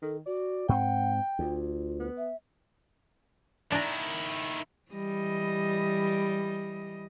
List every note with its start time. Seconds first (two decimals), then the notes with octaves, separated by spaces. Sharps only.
0.03 D#3 A4
0.26 F#4 D5
0.69 G#2 C4 F#5 G5
1.39 D2 F4
2.00 B3
2.18 E5
3.72 D#3 D4 E4 A#5
4.92 E3 G3 D#5